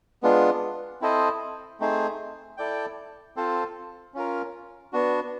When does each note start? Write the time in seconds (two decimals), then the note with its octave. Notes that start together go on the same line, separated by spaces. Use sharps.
0.23 G#3 B3 D4 F4
1.01 C4 E4 A4 C5 D#5
1.80 A3 C4 D#4 G#4 C5
2.57 E4 A4 D5 G5
3.36 C4 F4 A4 C5
4.14 C#4 F4 A#4
4.93 B3 D4 F#4